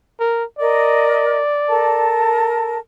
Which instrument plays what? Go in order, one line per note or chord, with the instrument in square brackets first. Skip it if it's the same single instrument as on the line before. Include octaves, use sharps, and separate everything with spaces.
[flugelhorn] A#4
[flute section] A#4 D#5 [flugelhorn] D5
[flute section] A4 A#4 A5